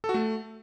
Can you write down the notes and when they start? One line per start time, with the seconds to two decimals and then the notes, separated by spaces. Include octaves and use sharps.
0.04 A4
0.09 F#4
0.14 A3